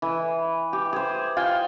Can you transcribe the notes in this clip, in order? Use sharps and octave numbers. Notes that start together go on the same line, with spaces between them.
E3
G4
G#4 C5
F4 G5 G#5